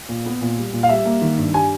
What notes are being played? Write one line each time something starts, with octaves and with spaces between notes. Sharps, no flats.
A#2
B3
A#2
G3
A#2
F5
G3 E5
A#3
D#3
G2
G3 G#5